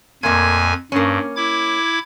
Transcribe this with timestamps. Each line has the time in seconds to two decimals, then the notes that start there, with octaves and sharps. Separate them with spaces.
0.23 F2 A#2 A3 A#3 G#5 G#6
0.92 G2 A#3 C#4
1.36 E4 D6 G#6